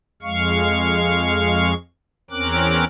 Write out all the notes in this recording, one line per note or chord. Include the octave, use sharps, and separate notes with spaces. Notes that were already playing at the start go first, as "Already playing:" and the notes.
F2 G#3 F5 C#6
E2 C4 C#4 A#4 D6 F#6